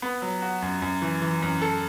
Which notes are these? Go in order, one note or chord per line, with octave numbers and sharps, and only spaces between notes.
B3
F#3
F#4
F#2
F#2
E3
E3
F#2
A4